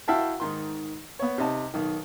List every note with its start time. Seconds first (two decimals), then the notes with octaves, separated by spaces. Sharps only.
0.08 E4 F#4 E5 F5 G5 A5
0.40 G#2 D#3 C6
1.19 B3 C#5
1.38 C3 D#4 D#5 A5
1.74 B1 D#3